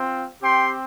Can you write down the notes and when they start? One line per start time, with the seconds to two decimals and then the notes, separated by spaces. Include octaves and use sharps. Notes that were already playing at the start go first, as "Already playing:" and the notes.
Already playing: C4 F4
0.41 C4 G4 G5 C6